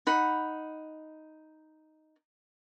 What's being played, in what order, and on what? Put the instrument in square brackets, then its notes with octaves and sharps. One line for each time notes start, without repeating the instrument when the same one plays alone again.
[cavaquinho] D#4 F#5 B5